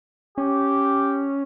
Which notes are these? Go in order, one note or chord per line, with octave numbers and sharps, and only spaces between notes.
C#4 G4